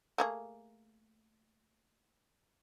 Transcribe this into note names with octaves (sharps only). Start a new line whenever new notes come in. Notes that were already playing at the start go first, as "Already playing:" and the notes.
A3 A#3 G#4